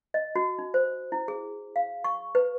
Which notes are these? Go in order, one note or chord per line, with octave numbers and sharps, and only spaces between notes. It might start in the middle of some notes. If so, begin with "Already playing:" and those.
D#5
F#4
D#4
C5
E4
G#4
F5
C#6
B4